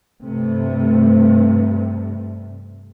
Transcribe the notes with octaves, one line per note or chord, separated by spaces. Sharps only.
G2 C3 A3